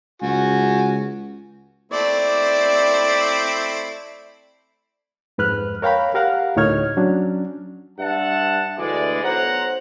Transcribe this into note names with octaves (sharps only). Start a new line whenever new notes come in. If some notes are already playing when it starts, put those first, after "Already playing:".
C#2 F#4 G#5
A3 C4 E4 D5
F2 G#2 B4 F6 F#6
A#4 C#5 F5 G5 A#5 B5
G4 A#4 F5 F#5
D2 A2 D#4 C#5 F6 G#6
F#3 C#4 D4
G2 E5 F#5 A5
D2 E3 G#3 D5
B1 C5 F#5 A#5